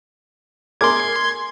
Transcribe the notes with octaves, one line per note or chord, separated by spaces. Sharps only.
G#4 A#4 C6 D6 G#6